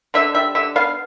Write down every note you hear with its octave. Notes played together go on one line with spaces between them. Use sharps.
D3 E5
G3 E5
D3 E5
B3 F5